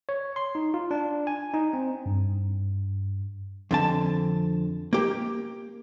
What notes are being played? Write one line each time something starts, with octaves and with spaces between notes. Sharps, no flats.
C#5
C6
D#4
F4
D4
G#5
D#4
C4
G2
F2 D3 A5
A#3 G4